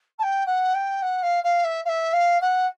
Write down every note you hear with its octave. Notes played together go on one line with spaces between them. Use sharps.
A5
G5
F#5
G5
F#5
F5
F5
E5
F5
E5
F5
F#5